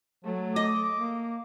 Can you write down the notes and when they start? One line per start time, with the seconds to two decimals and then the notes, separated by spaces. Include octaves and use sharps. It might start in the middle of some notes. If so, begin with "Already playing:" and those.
0.25 F#3 A3
0.56 D#5 D6
0.98 A#3